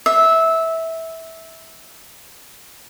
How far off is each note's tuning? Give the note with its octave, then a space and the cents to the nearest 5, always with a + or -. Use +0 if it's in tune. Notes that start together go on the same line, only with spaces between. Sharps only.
E5 -15